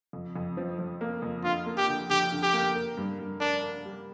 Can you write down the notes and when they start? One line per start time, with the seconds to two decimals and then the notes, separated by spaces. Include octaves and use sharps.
0.13 F2
0.36 F2
0.57 F3
0.79 F3
1.01 A#3
1.22 F2
1.44 D3 F4
1.66 A#3
1.77 G4
1.88 D3
2.09 D3 G4
2.32 D3
2.43 G4
2.53 A#3
2.76 A#4
2.97 G2
3.19 G2
3.40 D4 A#4
3.63 A#4
3.85 G3